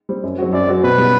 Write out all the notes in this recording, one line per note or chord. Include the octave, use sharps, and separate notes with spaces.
G3 C4
F#2
F#3 C4 F#4
F#2 D5
F#3 C4 F#4
B2 B4
G3 B3